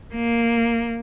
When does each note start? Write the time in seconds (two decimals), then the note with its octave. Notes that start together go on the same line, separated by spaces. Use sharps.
0.14 A#3